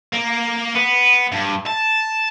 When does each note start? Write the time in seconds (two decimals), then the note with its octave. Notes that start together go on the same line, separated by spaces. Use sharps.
0.13 A#3
0.75 B3
1.32 G2
1.66 A5